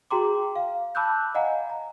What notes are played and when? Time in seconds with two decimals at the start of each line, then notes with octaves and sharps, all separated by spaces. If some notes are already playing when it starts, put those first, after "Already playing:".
0.11 F#4 G#4 G5 A#5 C6 D6
0.56 F5
0.95 A5 B5 D6 E6 F#6 G6
1.35 D#5 F5 F#5 G#5 A#5
1.70 A#5